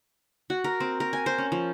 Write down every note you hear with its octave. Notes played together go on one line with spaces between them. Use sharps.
F#4
A#4
C4
A#4
G#5
C5
C#4
F3